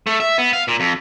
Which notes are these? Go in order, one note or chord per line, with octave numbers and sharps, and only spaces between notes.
A3
E5
B3
F5
A#2
F2